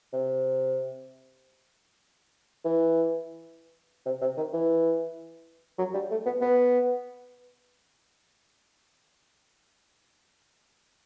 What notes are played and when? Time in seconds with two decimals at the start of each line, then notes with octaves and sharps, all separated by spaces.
0.13 C3
2.64 E3
4.06 C3
4.21 C3
4.37 D#3
4.53 E3
5.78 F#3
5.94 G3
6.10 A3
6.26 B3
6.41 B3